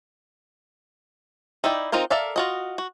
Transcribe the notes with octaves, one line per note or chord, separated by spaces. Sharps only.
D#4 E4 D5 G5
C4 D#4 F4 A#4 C5
A4 A#4 D5 E5 F5
F4 F#4 D#5
F#4